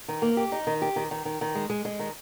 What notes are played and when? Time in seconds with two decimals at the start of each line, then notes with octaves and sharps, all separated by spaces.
0.08 D#3
0.22 A#3
0.37 G4
0.52 D#4
0.67 D#3
0.82 G4
0.96 D#3
1.11 D#3
1.25 D#3
1.41 D#3
1.55 G#3
1.70 G#3
1.85 G#3
1.99 D#3